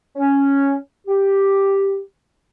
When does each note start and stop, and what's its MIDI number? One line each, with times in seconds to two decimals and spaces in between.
0.16 0.75 61
1.07 2.00 67